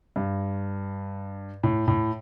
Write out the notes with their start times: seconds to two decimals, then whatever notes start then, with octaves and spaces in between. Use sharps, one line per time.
0.16 G2
1.63 A2
1.88 A2